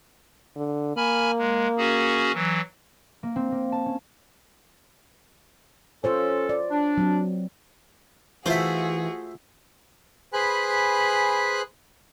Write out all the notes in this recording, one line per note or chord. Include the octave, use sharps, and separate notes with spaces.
D3
A#3 G#5 B5 F6
G#3
C#4 F#4 G#4
E3 F#3
A#3
C4
A#3
A5
C#4
C#4 F4 A4 C5 C#5
D5
D4
F#3 C4
E3 A3 F4 F#4 G#4 C5 E5
G#4 B4 C5 G#5 B5 F#6